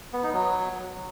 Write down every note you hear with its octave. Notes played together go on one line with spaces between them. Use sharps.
B3
D#4
F#3